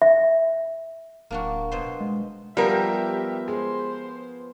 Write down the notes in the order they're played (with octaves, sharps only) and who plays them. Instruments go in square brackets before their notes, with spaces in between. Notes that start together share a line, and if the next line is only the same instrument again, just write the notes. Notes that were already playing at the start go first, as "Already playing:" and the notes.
[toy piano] E5
[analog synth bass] D1 [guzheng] A#3 D4 F#4
[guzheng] B2 C5
[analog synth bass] G#3
[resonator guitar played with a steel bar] F3 A#4 [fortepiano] G3 [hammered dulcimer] B3 [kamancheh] G4 E5
[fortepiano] G#3 [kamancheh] C5